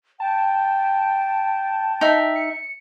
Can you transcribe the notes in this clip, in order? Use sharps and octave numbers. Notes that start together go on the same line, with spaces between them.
G5 A5
D#4 E5
C#7